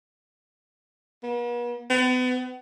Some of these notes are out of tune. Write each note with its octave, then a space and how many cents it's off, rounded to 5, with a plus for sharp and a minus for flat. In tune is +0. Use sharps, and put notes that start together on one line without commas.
B3 -45
B3 +35